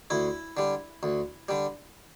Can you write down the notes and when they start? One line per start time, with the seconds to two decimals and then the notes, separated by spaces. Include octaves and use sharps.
0.10 D2 E4
0.57 D3 G3
1.03 D2
1.49 D3 G3